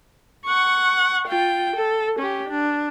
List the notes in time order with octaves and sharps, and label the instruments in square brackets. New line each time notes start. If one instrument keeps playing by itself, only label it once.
[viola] F#5 C#6
F4 G5
A4
C#4 G4
D4